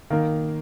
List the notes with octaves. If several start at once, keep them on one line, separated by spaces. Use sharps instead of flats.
D#3 A#3 F5